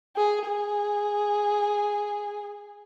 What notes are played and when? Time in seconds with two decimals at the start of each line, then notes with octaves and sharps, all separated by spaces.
0.17 G#4
0.47 G#4